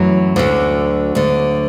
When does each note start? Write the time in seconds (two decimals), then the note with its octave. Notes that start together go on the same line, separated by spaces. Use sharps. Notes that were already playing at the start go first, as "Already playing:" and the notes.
Already playing: F#2 E3 F#3 A3
0.36 D2 D3
1.15 D2 D3